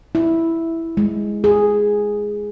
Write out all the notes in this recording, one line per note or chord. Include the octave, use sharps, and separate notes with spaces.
E4
G#3
G#4